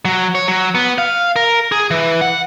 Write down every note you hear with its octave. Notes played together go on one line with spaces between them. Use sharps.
F#3
C#5
F#3
B3
F5
A#4
G#4
E3
F#5